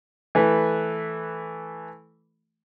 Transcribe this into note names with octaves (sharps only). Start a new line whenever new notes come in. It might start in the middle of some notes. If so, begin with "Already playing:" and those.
E3 A3 B4